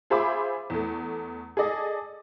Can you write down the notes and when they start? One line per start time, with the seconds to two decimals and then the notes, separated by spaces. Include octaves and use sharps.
0.10 F4 G#4 C5 E5 B5 D6
0.70 E2 A3
1.57 G#4 A4 D5 D#5